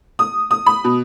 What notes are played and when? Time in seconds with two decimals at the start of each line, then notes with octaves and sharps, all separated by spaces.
0.19 D#6
0.51 D#6
0.66 B5
0.84 B2